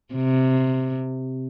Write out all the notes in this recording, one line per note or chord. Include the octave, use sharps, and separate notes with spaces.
C3